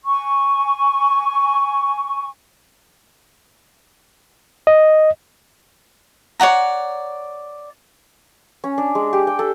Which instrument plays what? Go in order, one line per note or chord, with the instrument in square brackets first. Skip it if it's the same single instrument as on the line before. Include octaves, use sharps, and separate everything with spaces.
[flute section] G#5 C#6
[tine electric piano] D#5
[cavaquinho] C#5 D5 F#5 A#5
[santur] C#4
D4
G#3
G4
G5
A4